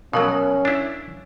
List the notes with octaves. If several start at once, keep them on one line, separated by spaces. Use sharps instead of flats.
B2 F#3 C#4 A#4 F5
D4 E4